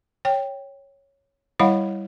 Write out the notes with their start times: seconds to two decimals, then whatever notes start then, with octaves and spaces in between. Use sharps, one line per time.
0.25 C#5 G5
1.59 G3 E4 C#5 F5 F#5 B5